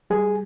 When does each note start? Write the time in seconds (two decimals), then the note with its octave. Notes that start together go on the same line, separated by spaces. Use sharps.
0.10 G3 G#4